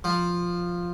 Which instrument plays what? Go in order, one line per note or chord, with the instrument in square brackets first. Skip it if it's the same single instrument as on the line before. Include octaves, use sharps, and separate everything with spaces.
[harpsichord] F3